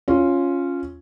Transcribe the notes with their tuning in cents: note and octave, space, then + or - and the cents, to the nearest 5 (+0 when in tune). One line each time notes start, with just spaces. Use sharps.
C#4 -5 F4 +0